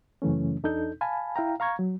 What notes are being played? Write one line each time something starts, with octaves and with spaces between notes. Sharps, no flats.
F#2 C#3 E3 A3 C#4
E2 D4 D#4 A4 G6
F5 G#5 A5 B5
E4 F5 G5 A#5
F5 A#5 C#6 G#6
F#3